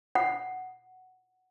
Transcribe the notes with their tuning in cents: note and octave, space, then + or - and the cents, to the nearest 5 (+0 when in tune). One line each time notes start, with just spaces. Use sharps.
F#5 +5